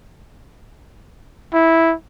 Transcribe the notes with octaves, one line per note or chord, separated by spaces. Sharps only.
E4